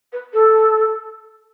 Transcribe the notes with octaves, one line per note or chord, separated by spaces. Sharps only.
B4
A4